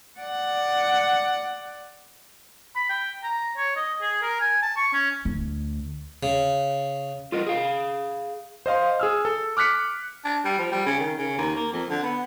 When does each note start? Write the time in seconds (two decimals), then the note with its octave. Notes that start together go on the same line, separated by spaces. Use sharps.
0.20 D5 F#5
2.76 B5
2.89 G5
3.23 A#5
3.57 C#5
3.76 D#5
4.01 G#4
4.22 A#4
4.40 G#5
4.62 A5
4.76 C#6
4.93 C#4
5.25 D2
6.23 C#3
7.32 F4 A4 A#4 D#5
7.47 G#4 F5
8.66 C5 D#5 F5 C6
9.00 G#4 E6 F6
9.25 A4
9.57 D6 F6 F#6 B6 C#7
10.24 D4
10.45 G3
10.59 F3
10.72 G3
10.86 C#3
11.00 D#3
11.18 C#3
11.38 D#2
11.56 A#3
11.73 F2
11.89 D3
12.03 B3